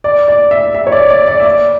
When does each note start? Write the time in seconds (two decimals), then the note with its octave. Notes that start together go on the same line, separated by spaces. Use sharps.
0.04 D5
0.28 D5
0.51 E5
0.75 E5
0.87 C#5
0.92 D5
1.10 D5
1.27 D5
1.40 E5
1.45 D5